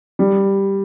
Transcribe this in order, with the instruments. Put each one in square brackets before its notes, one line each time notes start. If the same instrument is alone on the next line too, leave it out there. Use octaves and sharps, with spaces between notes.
[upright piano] G3